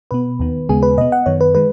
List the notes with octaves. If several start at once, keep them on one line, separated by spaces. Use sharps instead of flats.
B2 B3 B4
D#2 D#3 B3
D#2 C#3 G#3 B3 G#4
B4
B2 B3 D#5
F#5
F#2 D#3 B3 C#5
B4
D#3 G#3 B4